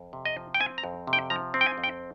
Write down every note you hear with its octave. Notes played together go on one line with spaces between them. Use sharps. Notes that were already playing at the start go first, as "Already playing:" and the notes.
Already playing: F2
C3
D#5
F3
G5
C4 G#5
A#5
F2
C3
G5
F3 A#5
C4
G5
G#5
F2
G5